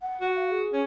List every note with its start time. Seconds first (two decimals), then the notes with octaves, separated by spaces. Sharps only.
0.02 F#5
0.21 F#4
0.36 F5
0.50 G#4
0.73 C#4